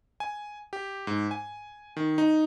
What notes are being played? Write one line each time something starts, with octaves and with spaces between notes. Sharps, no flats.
G#5
G4
G#2
G#5
D#3
D#4